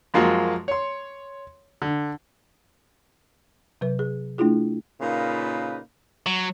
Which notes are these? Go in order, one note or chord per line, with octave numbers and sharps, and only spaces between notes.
F#2 F3 G#3 A#3 F4 F#4
C#5 C6
D3
C3 F#3 B4
G#4
A3 D4 E4 F4 G#4
A#2 C#3 A#3 D#4 F4 B4
F#3